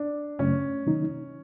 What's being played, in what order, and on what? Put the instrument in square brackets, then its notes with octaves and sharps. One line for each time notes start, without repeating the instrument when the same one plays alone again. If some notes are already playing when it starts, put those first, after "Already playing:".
Already playing: [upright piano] D4
[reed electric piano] F#2 C#3 F#3 A3 [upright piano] C#4
[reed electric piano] C3 D#3 F#3 A#3 D#4